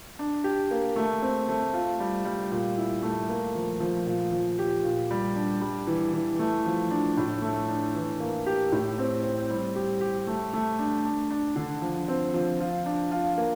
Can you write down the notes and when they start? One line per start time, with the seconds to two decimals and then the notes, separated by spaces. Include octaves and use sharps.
0.19 D4
0.44 G4
0.71 A#3
0.96 A3
1.22 C4
1.48 A3
1.73 F4
2.00 G3
2.25 G3
2.51 A#2
2.77 E4
3.03 A3
3.29 A#3
3.55 F3
3.80 F3
4.07 A#2
4.32 F3
4.59 G4
4.84 A#2
5.11 G3
5.36 D4
5.61 G3
5.87 E3
6.13 E3
6.39 A3
6.66 F3
6.91 D4
7.17 A2
7.42 A3
7.68 D4
7.95 E3
8.20 A#3
8.47 G4
8.72 A2
8.98 C4
9.23 C4
9.50 G3
9.76 G4
10.01 G4
10.27 A3
10.54 A3
10.79 D4
11.05 D4
11.31 D4
11.56 D3
11.82 F3
12.08 C4
12.34 F3
12.60 F4
12.86 D4
13.11 F4
13.38 A#3